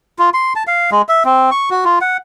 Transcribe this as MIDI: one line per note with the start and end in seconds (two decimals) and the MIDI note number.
0.19 0.30 65
0.34 0.53 84
0.56 0.63 81
0.67 0.90 77
0.92 1.02 56
1.09 1.23 76
1.25 1.50 60
1.51 1.69 85
1.70 1.84 66
1.85 1.99 65
2.01 2.17 78